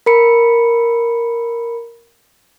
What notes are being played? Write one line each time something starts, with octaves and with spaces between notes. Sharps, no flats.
A#4 B5 C#7